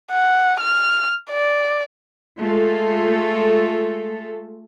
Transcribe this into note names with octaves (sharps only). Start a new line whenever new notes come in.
F#5
F6
D5
G#3 A3 F4 A4